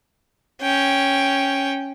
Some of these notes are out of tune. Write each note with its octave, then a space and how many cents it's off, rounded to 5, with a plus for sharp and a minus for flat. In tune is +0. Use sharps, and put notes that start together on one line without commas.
C#4 +0 G5 +0